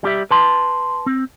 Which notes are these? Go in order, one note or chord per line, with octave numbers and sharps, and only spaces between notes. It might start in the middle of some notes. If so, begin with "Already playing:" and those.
G3 G4 E5
B4 A5 C6
C4